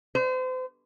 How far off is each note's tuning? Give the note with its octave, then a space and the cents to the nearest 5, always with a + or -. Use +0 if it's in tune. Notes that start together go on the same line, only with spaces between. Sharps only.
C5 -35